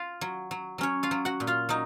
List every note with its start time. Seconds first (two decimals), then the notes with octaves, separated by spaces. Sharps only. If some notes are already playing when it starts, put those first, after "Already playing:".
Already playing: F4 F5
0.21 F#3
0.51 F#3
0.78 F#3 C#4 C#5
1.03 F4 F5
1.11 F#3
1.25 F#4 F#5
1.40 A#2
1.47 F4 F5
1.69 F#3 D#4